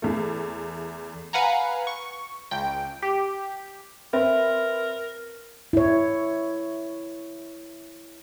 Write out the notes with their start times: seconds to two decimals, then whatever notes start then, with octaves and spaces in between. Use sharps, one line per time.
0.02 E2 A3
1.33 B4 F5 F#5 G#5 A#5
1.87 C#6
2.51 C#2 G5
3.02 G4
4.13 C4 A#4 B4 E5
5.73 E4 C#5